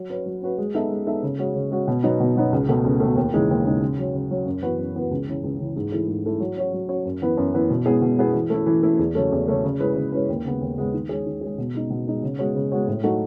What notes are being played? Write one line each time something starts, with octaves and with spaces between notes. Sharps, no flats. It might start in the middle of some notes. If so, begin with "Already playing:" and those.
Already playing: F#3
C#4 F#4 B4
F#3
C#4 F#4 B4
G#3
B3 D#4 A4 E5
G#3
B3 D#4 A4 E5
C#3
G#3 C#4 F#4
C#3
G#3 C#4 F#4
B2
F#3 B3 D#4
B2
F#3 B3 D#4
C#2
B2 A3
C#2
B2 A3
D#2
C#3 E3 G#3 D#4
D#2
C#3 E3 G#3 D#4
C#3
F#3 C#4
C#3
F#3 C#4
F#2
E3 B3 F#4 B4
F#2
E3 B3 F#4 B4
C#2
C#3 E3
C#2
C#3 E3
G#2
E3 A3 E4 G#4
G#2
E3 A3 E4 G#4
F#3
C#4 F#4 C#5
F#3
C#4 F#4 C#5
F#2
E3 B3 E4 B4
F#2
E3 B3 E4 B4
B2
G#3 B3 E4 G#4
B2
G#3 B3 E4 G#4
E3
A3 E4
E3
A3 E4
E2
C#3 F#3 A3 C#4
E2
C#3 F#3 A3 C#4
C#3
G#3 C#4 E4 B4
C#3
G#3 C#4 E4 B4
D#2
C#3 G#3 B3
D#2
C#3 G#3 B3
D#3
G#3 C#4 G#4
D#3
G#3 C#4 G#4
B2
G#3 D#4
B2
G#3 D#4
C#3
G#3 B3 F#4 C#5
C#3
G#3 B3 F#4 C#5
A2
F#3 A3 D#4 F#4